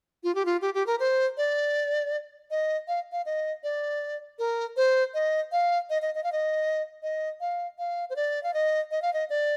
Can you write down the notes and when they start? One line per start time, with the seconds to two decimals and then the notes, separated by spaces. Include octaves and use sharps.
0.24 F4
0.35 G4
0.45 F4
0.61 G4
0.74 G4
0.87 A#4
1.00 C5
1.37 D5
2.51 D#5
2.88 F5
3.12 F5
3.26 D#5
3.63 D5
4.39 A#4
4.77 C5
5.14 D#5
5.52 F5
5.90 D#5
6.02 D#5
6.15 D#5
6.24 F5
6.32 D#5
7.03 D#5
7.41 F5
7.79 F5
8.10 C5
8.16 D5
8.43 F5
8.54 D#5
8.91 D#5
9.02 F5
9.14 D#5
9.30 D5